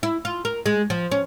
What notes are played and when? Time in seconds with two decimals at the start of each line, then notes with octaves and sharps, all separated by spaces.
0.03 E4
0.25 F4
0.45 A#4
0.66 G#3
0.90 F3
1.11 C#4